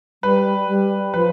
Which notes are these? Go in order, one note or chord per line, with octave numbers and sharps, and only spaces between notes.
G3 B4
G3
F3 B4